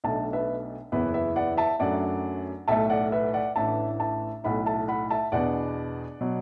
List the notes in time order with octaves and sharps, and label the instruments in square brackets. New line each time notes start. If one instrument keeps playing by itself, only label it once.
[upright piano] B1 B2 A3 D4 E5 A5
B4 E5
F#1 E2 E3 B3 E4 B4
B4 E5
D5 F#5
E5 A5
F#2 F#3 A3 D4 D5 F#5
B1 A2 A3 E5 A5
D5 F#5
B4 E5
D5 F#5
A1 A2 E3 D4 E5 A5
E5 A5
B1 A2 A3 E4 F#5 B5
E5 A5
F#5 B5
E5 A5
E2 B2 B3 D4 D5 F#5
B2 F#3